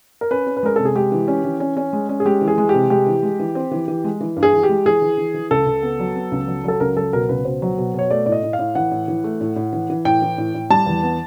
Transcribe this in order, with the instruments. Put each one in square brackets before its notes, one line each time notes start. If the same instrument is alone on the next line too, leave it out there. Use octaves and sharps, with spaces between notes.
[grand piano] A#4
[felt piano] C#4 [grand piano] B4
[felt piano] C#4
[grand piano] B4
[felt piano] G#3 [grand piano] A#4
[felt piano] C3 [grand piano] A4
[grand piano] G#4
[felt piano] G#3 [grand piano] G4
[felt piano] E3
C#4
E3
C#4
C#4
G#3
C#4
[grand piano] G#4
[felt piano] G#3 [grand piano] G4
[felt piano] E3
[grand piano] G#4
[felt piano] G#3
[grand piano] G4
[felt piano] C3
[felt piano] G#3 [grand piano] G4
[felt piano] E3
G#3
E3
C4
E3
E3
G#3
E3
G2
[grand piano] G#4
[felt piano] E3
[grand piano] G4
[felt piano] G#3
[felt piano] E3 [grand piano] G#4
[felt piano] E3
E3
E3
[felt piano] C#2 [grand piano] A4
[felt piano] C#2
B3
F#3
B3
C#2
F#3
[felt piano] F#3 [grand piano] A4
[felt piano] C#2 [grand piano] A#4
[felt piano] F#3 [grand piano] A4
[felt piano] B2 [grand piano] A#4
[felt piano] C#2 [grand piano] B4
[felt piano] B2 [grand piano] C5
[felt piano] F#3
B2
[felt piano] B2 [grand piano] C#5
[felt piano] A3 [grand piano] D5
[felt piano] A2 [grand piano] D5
[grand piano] D#5
[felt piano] A2
[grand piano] F5
[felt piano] A2
[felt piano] E3 [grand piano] F#5
[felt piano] A2
E3
A3
A2
A2
E3
E3
[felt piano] A2 [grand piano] G5
[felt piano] E3
A2
A2
[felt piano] G3 [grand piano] A5
[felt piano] E2
B3